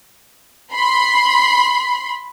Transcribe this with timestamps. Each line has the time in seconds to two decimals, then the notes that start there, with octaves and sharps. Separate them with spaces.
0.73 B5 C6